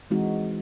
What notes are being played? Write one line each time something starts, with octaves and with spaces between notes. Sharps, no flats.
E3 G#3 C4 D#4 F#4